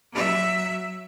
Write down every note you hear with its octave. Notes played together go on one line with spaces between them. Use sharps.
F#3 E5